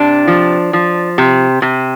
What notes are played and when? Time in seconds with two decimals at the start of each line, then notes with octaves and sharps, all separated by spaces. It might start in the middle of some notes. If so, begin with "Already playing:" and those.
Already playing: C3 D4
0.27 F3
0.73 F3
1.18 C3
1.62 C3